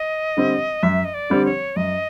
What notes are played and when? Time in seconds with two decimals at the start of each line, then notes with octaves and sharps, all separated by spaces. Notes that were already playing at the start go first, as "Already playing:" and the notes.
Already playing: D#5
0.37 D3 G3 C4
0.83 F#2 E5
1.05 D#5
1.14 D5
1.30 D3 G3 C4
1.45 C#5
1.76 F#2 D#5